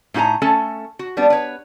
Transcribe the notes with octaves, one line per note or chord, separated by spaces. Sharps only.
A2 D#4 F4 G#5 A#5
A3 C#4 A4 G#5
F#4
G3 B3 D4
B4 C#5